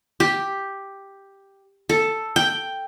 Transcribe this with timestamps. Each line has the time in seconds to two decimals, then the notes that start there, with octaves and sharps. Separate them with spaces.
0.20 G4
1.89 A4
2.36 G5